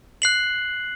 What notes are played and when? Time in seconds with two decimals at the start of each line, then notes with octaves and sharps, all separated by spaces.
0.22 F#6 C7 F#7